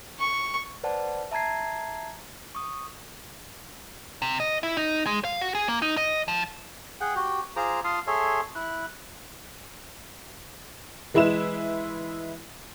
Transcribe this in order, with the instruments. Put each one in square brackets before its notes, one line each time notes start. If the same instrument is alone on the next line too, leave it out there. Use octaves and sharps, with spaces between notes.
[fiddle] C#6
[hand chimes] B4 C5 D5 F#5 A5
E5 A5 A#5 G#6 C7
C#6 D#6
[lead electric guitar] C3
D#5
E4
D#4
G#3
F5
F#4
G#4
A#3
D#4
D#5
F3
[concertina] G#4 F#5 G5
F#4 G4 G5
F4 G#4 C5 A#5 D6
F4 F5 A5 C6 D#6
G#4 A4 C#5 E5 C6
E4 F#6
[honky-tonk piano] E3 G#3 E4 B4 E7